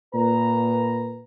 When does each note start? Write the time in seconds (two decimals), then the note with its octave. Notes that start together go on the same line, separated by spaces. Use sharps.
0.15 A#2 B4 A#5